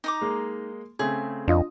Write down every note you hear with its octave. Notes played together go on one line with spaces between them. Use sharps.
D#4 A#5 D6
G#3 A#3
C#3 A3 C4 G#4
F2 D4 F4 D#5